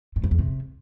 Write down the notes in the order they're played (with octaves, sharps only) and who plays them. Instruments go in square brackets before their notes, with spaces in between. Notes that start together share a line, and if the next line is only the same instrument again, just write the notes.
[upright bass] G#2
F#2
E2
C3